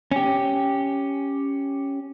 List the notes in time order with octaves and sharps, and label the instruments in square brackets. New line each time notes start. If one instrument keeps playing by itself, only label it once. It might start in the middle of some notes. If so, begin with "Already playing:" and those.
[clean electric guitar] C#4 G4